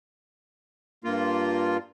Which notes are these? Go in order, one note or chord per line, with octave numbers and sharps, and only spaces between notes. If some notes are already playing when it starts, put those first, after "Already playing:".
G2 A#3 F4